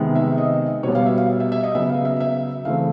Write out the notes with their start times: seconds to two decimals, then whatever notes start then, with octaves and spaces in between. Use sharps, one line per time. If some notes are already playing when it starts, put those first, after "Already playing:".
Already playing: C3 D#3 G#3 B3
0.15 E5
0.38 D#5
0.83 B2 G3 B3 C#5
0.95 F5
1.06 E5
1.18 F5
1.40 E5
1.52 E5
1.63 D#5
1.75 C#3 F#3 B3 E5
1.90 F5
2.05 E5
2.20 E5
2.65 C#3 E3 A3 C4 F5